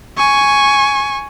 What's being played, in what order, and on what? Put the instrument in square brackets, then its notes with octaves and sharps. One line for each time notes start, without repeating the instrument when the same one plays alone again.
[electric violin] G#5 C#6